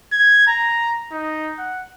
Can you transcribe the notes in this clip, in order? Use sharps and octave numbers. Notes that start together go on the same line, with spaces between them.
G#6
A#5
D#4
F#5